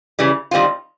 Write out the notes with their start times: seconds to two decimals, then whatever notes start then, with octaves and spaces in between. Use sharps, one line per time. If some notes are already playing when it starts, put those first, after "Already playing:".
0.19 C#3 E3 G3
0.51 D#3 G3 C4 F4